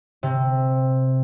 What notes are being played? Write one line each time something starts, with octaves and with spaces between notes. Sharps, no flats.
C3